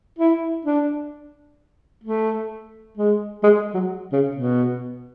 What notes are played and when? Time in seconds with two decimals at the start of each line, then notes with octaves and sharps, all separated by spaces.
0.19 E4
0.65 D4
2.04 A3
2.98 G#3
3.44 G#3
3.74 F#3
4.13 C#3
4.36 B2